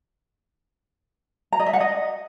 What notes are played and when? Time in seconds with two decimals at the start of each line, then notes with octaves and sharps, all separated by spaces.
1.52 A#5
1.59 D#5
1.66 E5
1.73 F#5
1.80 D#5